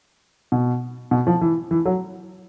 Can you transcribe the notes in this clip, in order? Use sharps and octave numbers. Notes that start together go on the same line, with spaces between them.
B2
B2
F3
E3
E3
F#3